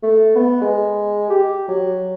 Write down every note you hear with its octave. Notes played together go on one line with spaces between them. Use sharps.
A3
B3
G#3
G4
F#3